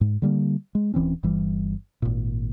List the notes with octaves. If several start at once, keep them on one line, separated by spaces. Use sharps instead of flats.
G#2
D3 G3 A#3
G#3
D#1 E3 C4 C#4
G1 E3 G3
G#1 A#2